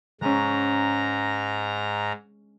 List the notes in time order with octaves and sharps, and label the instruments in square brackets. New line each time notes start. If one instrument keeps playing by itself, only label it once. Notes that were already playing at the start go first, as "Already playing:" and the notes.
[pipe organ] G#2 A#5 [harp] G#3 C#4